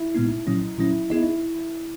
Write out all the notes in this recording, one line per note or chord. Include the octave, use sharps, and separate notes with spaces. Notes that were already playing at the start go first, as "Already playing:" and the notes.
Already playing: E4
A#2 G#3 B3 D#4
A#2 F#3 C#4 D#4
A#2 F#3 C#4 E4
B3 D#4 E4 G#4 D#5